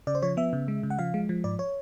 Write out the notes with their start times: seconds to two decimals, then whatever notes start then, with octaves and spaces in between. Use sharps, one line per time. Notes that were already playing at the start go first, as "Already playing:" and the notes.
0.07 C#3 D5
0.15 C5
0.22 F3 C#5
0.37 B3 E5
0.53 C#3
0.68 G#3
0.83 C#3
0.90 F#5
0.99 F3 F5
1.14 G#3
1.29 F3
1.44 G#2 D5
1.59 C#5